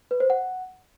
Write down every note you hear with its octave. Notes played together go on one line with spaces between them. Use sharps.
B4
C5
F#5